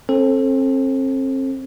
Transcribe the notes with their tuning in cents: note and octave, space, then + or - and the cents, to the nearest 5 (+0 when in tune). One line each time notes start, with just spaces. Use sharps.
C4 +35 A4 +0